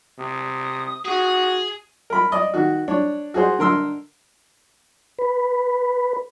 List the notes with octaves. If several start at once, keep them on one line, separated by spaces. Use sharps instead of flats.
C3 D#6
F#4 G#4
A#4 B5
D5 D#5
D#3 F#4
D4 C#5
F#4 G#4 C5
D3 A#4 C6 E6
B4